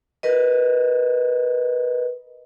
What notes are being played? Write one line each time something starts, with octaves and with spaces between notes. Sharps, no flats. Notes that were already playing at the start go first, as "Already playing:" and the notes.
A#4 B4 D#5